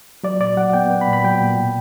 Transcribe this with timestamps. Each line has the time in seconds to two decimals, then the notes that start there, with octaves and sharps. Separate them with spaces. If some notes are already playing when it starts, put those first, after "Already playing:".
0.24 F#3 D5
0.40 A#2 D5
0.57 F#3 F#5
0.73 B3 G5
0.90 B3
1.01 B5
1.08 A#2
1.13 B5
1.24 F#3 G5
1.41 A#2
1.58 B2